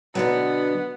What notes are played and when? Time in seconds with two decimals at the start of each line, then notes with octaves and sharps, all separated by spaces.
0.15 B2 D3 F#3 B3